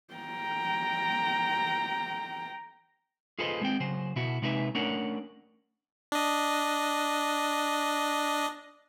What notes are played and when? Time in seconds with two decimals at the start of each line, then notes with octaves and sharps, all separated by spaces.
0.14 G5 A#5
3.39 F4 G#4 A4 B4 C5 D#5
3.61 G#3 C4 G5
3.80 C#3 F#3 C5
4.16 B2 E4 F#4
4.42 C3 G#3 D#4 E4 B4 E5
4.75 A3 C#4 D4 A#4 D5 F#5
6.12 D4 D#5